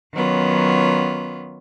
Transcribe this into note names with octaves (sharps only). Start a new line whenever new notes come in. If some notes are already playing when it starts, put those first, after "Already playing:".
D#3 F#3 B3 C#4 F4